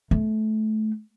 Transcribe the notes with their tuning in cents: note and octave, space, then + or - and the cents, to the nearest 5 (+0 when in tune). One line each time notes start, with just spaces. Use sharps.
A3 -20